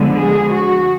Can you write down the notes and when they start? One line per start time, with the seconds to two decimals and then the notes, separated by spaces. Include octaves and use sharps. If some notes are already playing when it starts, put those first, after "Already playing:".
Already playing: D3 F3 G#3 B3
0.17 G#4
0.52 F#4